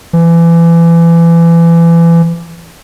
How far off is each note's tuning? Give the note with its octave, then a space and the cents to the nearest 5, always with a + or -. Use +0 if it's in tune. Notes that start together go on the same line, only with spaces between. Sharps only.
E3 +30